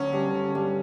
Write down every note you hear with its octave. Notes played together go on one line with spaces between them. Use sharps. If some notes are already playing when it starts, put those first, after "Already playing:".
Already playing: D2 D3 F#3 C#4
G2
D3
G2